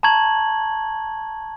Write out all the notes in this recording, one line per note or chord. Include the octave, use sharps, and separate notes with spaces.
A5 A#5 C#6 G#6 F#7